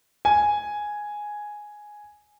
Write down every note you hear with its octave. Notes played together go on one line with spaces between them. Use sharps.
G#5